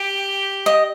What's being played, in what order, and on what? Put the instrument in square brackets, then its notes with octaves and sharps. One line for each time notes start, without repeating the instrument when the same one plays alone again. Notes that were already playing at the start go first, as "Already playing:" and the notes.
Already playing: [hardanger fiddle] G4
[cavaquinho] D#5